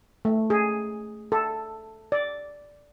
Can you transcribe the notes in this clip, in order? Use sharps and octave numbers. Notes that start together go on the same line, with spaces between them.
A3
G#4
A4
D5